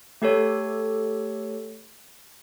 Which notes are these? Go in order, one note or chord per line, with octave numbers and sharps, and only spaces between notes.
A3 G4 A4 C#5